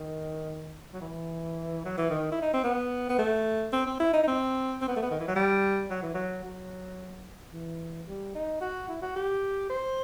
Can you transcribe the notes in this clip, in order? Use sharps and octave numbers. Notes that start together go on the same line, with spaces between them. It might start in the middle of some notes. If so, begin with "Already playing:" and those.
Already playing: D#3
F#3
E3
F#3
E3
D#3
E4
D#4
C4
B3
B3
A3
C4
C4
E4
D#4
D#4
C4
C4
B3
A3
B3
D#3
E3
F#3
G3
F#3
E3
F#3
F#3
E3
G3
D#4
F#4
E4
F#4
G4
C5